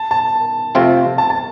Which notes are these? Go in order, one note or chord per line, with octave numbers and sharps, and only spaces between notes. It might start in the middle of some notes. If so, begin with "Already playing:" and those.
Already playing: A5
A5
C3 F3 A3 C4 F4
A5
A5